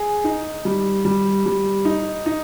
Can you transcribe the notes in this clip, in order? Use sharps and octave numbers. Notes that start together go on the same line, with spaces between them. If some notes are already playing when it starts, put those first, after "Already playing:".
Already playing: G#4
D#4
G3
G3
G3
D#4
D#4